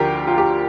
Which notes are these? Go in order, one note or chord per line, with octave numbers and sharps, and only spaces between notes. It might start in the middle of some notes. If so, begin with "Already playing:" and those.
Already playing: D2 D3 F3 F4 G4 A#4
F4
G4